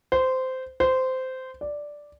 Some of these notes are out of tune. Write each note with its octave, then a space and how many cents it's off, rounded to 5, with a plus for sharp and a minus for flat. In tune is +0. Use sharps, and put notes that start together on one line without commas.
C5 -15
C5 -15
D5 +0